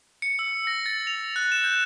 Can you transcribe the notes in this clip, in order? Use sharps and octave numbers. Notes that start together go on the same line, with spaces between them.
C#7
E6
A#6
A6
F7
F#6
E7
G6